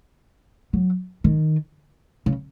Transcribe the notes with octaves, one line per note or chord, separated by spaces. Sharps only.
F#3
D#3
C#3